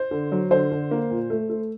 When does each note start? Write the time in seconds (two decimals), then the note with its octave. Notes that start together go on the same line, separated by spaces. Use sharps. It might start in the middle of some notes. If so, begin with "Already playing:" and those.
Already playing: C5
0.11 D3
0.32 F#3
0.51 D3 C5
0.72 D3
0.91 A#3
1.11 A#2
1.30 A3
1.50 A3